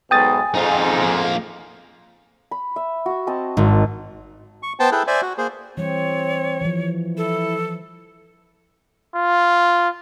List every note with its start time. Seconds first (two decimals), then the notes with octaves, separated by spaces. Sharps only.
0.11 B1 G#2 B2 G5 G#5 D#6 A6
0.55 F2 G#2 D#4 F4
1.03 F3 A#3
2.51 B5
2.76 E5
3.06 F#4 E5
3.27 C4 D#5 A5
3.57 G#1
4.63 C#6
4.80 B3 C5 G5 A5
4.92 E4 G#4 A4 B4 G5
5.07 C5 D5 E5 G#5
5.22 F#4
5.38 A#3 G#4 C5
5.77 E3 G3 C4 C#5
6.61 E3 F3
7.17 E4 A4
9.14 F4